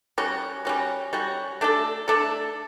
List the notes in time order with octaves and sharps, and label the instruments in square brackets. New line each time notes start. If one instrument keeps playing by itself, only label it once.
[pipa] G3 C#4 F#4
G3 C#4 F#4
G3 C#4 F#4
A3 D4 A4
A3 D4 A4